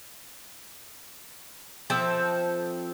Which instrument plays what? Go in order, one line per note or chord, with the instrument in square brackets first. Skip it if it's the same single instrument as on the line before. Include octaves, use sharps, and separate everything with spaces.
[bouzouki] F3 C4 A4 E5